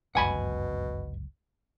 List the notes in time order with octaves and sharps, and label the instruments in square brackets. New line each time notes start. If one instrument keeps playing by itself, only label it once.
[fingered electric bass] G1 C#2 F#2 [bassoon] B2 [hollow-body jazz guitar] F#5 G#5 B5